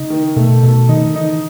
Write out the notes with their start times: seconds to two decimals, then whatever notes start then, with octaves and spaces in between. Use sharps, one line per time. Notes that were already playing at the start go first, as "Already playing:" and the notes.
Already playing: C#3 D#4
0.10 D#3
0.36 B2 A3
0.63 B2 A4
0.89 D#3 D#4
0.97 C#3
1.05 D#3
1.16 E3 D#4